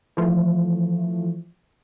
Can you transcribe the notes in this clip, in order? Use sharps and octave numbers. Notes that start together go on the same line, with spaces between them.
E3 F3 A3